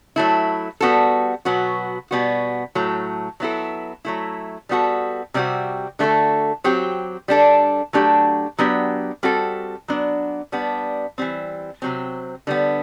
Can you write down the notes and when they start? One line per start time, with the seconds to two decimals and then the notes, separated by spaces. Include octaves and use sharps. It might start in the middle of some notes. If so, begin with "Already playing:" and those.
0.16 F#3 A3 E4
0.81 G3 B3 F#4 A4
1.45 B2 F#3 B3 F#4
2.11 B2 G3 B3 F#4
2.75 A2 F#3 A3
3.40 F#3 B3 E4 A4
4.05 F#3 A3 E4
4.69 G3 B3 F#4 A4
5.34 C3 G3 C4 F#4
5.99 D3 A3 C4 F#4 A4
6.64 F#3 C4 G4
7.28 G3 D4 A4
7.93 F#3 A3 D4 G4
8.59 F#3 B3 D4 G4
9.23 G3 C4 F#4 A4
9.88 F#3 B3 D4
10.52 G3 B3 D4
11.18 E3 G3 C4
11.82 C3 F#3 C4
12.47 D3 G3 B3